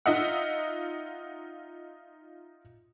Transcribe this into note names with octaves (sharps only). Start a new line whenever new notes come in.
D#4 F4 D#5 E5 F#5